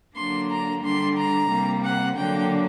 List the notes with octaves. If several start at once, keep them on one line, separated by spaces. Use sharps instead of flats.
D3 F#3 A#3 D4 C6
A#5
D3 G3 D4 C6
A#5
C3 G3 A#3
F#5
D3 F#3 A#3 D4 G5